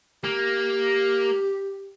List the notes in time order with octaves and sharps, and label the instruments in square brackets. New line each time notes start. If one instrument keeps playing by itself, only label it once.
[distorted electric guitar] A#3 [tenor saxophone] G4